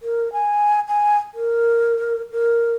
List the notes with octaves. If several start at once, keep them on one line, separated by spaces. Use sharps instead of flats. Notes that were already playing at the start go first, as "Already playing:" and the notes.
A#4
G#5
G#5
A#4
A#4